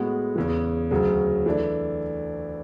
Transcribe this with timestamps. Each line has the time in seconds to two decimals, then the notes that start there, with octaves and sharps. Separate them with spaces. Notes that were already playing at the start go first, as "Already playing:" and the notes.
Already playing: A2 G#3 B3 F#4
0.36 E2 C#3 E3
0.91 D2 C#3 F#3
1.46 E3 A3 D4